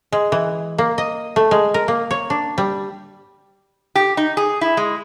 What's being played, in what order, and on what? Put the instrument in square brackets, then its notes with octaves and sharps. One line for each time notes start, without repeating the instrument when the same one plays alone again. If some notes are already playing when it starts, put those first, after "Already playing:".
[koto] G#3
E3
A#3
D#5
A3
G#3
A#4
A#3
C#5
D4
G3
[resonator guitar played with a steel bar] G4
D#4
G#4
E4
G#3